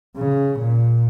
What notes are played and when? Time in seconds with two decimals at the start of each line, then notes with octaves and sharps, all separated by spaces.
0.17 C#3
0.59 A#2